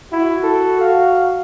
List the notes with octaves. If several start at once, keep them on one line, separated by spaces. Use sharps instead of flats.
E4 F#4
A4
F5